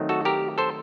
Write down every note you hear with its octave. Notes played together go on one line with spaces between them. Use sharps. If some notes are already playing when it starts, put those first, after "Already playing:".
Already playing: D#3 F#3 A3 C4 D#4
F#4 A4
G4 A#4
A4 C5